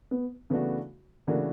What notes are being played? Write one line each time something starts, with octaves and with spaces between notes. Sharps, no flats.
B3
C#3 E3 A3 B3 D4 F#4
C#3 E3 A3 A#3 D4 F#4